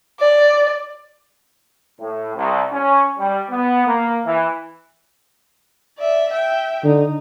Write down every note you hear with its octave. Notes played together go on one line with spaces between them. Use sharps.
D5
A2
C2
C#4
G3
B3
A#3
E3
D5 E5
E5 G5
D3 D#4